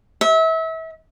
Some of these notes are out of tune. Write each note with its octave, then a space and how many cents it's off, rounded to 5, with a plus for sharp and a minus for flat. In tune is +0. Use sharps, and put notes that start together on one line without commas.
E5 -30